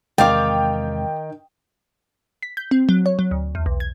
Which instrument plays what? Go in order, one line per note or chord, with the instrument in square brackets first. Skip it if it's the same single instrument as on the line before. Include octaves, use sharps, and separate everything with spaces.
[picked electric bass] E2 C3 G#3 [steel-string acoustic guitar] D#3 [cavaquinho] D5 F5 D6 [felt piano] G5
[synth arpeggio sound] B6
G6
C4
F#3
C#5
F#3
D2
E2
B1
G#6